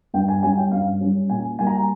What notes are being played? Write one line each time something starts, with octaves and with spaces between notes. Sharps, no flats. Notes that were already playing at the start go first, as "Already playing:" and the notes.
G2 G5
G#5
G3 C#4 G#5
G5
G2 F5
G3 C#4
A#2 G#5
G3 A#3 G#5
A#5
G#5